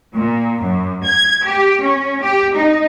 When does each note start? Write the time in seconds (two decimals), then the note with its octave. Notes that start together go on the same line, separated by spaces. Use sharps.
0.15 A#2
0.61 F#2
1.04 G#6
1.45 G4
1.82 C#4
2.23 G4
2.56 D#4